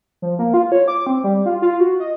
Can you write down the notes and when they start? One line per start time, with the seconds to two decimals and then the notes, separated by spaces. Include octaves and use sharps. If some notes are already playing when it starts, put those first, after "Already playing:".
0.22 F3
0.39 A#3
0.54 F4
0.72 C#5
0.88 D6
1.07 C4
1.24 G3
1.46 F4
1.62 F4
1.80 F#4
2.00 D#5